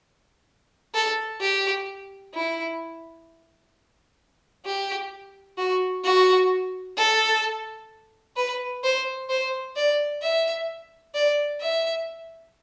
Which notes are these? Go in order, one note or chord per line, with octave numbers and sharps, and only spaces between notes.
A4
G4
E4
G4
F#4
F#4
A4
B4
C5
C5
D5
E5
D5
E5